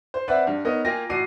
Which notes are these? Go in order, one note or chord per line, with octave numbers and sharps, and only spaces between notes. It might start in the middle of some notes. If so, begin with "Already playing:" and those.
C5
C4 B4 D5 E5 F#5
G2 G3
B3 D#4 A#4 C#5 D#5
A#3 F4 G5 G#5 A#6
A1 F#4 D6 C7 D#7